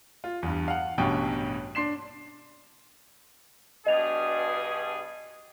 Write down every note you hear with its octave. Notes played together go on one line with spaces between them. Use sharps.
F4
E2 G2
F5 F#5
A1 G2 B2 C#4 G5
D4 C6 C7 E7
G2 B2 G#4 D#5 F7